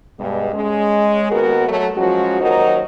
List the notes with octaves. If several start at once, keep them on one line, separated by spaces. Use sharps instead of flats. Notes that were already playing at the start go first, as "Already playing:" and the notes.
G2 B2 G#3
G#3 C#4
D#2 B3 F#4 A#4
F#3 A3
F3 F#3 G#3 C#4 F#4
D#2 F#3 D#4 F#4 A#4 C5